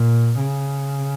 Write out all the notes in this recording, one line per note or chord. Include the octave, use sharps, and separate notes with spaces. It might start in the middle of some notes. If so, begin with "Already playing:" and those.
Already playing: A#2
C#3